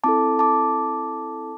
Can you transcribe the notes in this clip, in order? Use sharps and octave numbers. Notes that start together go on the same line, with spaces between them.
C4 E4 A4 A5 D6
A5 D6